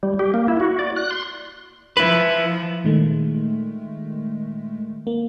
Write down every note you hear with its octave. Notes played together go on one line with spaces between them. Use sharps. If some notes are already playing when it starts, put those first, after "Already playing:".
G3
G4
A#3
E4
F#4
D5
F#6
C6
F3 E4 B4
A#2 D#3 G#3 A3
A#3